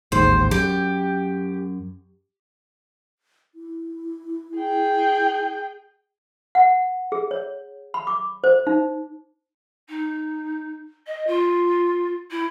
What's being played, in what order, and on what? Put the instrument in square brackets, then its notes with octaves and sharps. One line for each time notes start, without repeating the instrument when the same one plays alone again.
[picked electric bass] A1 D#2 G#2 [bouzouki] C5
[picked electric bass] F#2 [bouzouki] G4
[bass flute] E4
[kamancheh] G#4 G5
[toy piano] F#5
G#4
C#5
B5
D6
C5
D#4
[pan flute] D#4
D#5
F4
E4